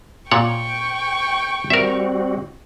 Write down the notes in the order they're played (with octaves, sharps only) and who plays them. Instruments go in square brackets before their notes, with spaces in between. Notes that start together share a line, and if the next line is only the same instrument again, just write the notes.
[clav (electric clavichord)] A#2 C#5 F#5 [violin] G5 C#6
[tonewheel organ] G3 C4 F#4 [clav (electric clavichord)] A#4 E5